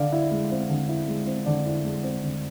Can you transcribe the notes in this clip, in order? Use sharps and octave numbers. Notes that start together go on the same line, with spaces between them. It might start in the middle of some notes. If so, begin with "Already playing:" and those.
Already playing: D3 D5 F5
E4
G#3
C4
D3
E4
G#3
C4
D3 D5
E4
G#3
C4
D3